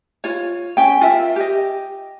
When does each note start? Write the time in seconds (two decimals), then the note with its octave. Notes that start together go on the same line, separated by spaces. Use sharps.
0.24 F4 C#5
0.77 C#4 G5
1.01 F4 A#4 E5
1.36 G4 D#5